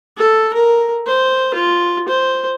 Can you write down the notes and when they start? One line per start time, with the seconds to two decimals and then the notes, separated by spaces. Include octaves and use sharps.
0.18 A4
0.54 A#4
1.07 C5
1.54 F4
2.08 C5